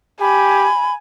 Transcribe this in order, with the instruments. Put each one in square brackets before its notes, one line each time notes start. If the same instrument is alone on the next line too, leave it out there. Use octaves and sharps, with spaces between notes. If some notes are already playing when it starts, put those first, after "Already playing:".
[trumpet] G4 [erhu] G#5 [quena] B5